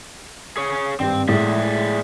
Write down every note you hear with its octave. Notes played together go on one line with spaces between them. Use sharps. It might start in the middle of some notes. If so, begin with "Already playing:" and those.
G#4 C#5
G#1 G2 C4
A2 G#3 G#4 D5 E5